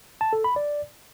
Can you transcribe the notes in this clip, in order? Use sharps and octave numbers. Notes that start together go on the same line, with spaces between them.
A5
A4
B5
D5